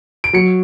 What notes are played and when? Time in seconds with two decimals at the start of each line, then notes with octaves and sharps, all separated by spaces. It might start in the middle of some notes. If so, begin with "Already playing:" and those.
0.24 D7
0.33 F#3 C#7